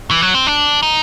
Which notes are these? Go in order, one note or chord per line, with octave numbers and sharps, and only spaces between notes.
E3
F#3
C4
D4
D#4